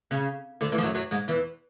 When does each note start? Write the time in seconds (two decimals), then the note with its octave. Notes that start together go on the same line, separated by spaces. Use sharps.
0.11 C#3
0.61 D2 D3
0.72 E2 E3
0.78 F3
0.83 F#2 F#3
0.95 F#2 F#3
1.11 G#2 G#3
1.28 E2 E3